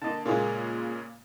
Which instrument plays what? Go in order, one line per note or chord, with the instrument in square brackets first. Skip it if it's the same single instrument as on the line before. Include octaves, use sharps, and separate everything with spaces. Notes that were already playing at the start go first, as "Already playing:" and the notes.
[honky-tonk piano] D3 A#3 [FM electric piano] D#5 A5
[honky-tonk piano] A#2 C#3 G#3 [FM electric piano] A#3 G#4